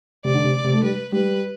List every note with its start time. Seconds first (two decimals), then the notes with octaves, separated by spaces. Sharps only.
0.25 C3 D5
0.34 D3
0.44 C3
0.64 C3
0.73 A3
0.83 G3 B4
1.12 G3 B4